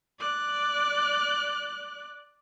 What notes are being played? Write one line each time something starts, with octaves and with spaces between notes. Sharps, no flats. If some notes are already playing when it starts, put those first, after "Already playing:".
D5 F#6